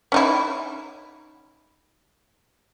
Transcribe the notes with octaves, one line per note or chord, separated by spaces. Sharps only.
C#4 D#4 E4